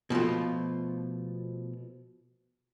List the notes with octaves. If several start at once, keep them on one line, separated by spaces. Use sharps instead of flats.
B2 F3 A3 F4